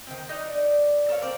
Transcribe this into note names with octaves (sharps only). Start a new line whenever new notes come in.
D#3 C4
D4 D#4 D#5
D5
A4 A#4 C#5 F5
A#3 C4 D5